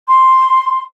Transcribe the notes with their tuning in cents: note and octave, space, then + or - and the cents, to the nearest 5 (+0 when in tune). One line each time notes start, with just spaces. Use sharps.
C6 +5